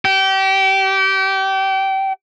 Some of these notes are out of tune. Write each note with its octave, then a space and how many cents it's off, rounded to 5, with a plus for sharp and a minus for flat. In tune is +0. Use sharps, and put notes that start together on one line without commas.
G4 -30